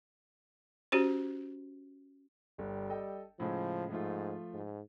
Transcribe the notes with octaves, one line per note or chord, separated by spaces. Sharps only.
C#4 F#4 G4 C5
G1 G3
A4 D#5 G5
A2 C#3 F3 G#3
G#2 F3 A3 F4
G#2